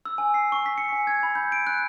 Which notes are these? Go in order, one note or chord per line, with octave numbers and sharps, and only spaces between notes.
E6
G#5
C7
C#6
B6
C#7
G#5
G#6
B5
G6
D7
F#6